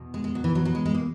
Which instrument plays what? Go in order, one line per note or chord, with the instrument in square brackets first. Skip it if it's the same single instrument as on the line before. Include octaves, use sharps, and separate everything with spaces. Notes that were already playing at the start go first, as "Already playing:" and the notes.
Already playing: [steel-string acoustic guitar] E2 B2
G#3
G#3
F#3
E3
F#3
F#3
G#3
G#3
A#3